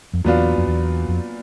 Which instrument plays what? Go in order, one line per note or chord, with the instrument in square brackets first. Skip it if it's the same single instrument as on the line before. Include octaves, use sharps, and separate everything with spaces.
[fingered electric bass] F2
[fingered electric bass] E2 [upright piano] A#2 F#3 B3 D4 F4
[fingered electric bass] F2
E2
F2